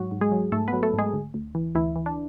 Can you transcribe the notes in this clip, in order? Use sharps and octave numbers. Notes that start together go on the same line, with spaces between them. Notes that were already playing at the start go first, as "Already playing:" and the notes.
Already playing: G#2 F#3 F#4
G#2
G#3 G#4
F#3
G#2 A3 A4
B3 B4
F#3
A3 A4
G#2
G#3 G#4
D2
D2
E3
D2 E3 E4
E3
D4